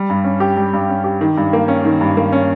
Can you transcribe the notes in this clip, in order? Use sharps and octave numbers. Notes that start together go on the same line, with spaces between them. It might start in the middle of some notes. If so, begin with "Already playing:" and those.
Already playing: G3
G2
C#4
G4
G3
G2
C#4
G4
D#3
G2
A#3
C#4
D#3
G2
A#3
C#4